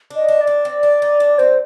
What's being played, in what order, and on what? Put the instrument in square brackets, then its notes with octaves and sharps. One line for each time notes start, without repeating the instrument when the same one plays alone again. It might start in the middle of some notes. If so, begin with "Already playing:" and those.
[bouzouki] D4
[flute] D#5
[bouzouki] D4
[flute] D5
[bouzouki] D4
C4
D4
D#4
D4
[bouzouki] C4 [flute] C5